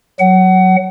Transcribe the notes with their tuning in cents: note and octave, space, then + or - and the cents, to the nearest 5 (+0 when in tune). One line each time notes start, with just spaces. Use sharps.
F#3 +0 F#5 +25